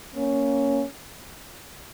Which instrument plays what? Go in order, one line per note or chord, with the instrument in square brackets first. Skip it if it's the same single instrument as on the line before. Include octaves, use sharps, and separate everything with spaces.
[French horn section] A#3 C#4